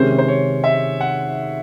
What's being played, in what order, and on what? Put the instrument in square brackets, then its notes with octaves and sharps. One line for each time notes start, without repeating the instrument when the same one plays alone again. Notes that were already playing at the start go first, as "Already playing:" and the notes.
Already playing: [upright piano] C3 D#3 G#3 C#4 [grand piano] C5
[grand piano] C5
C#5
E5
F#5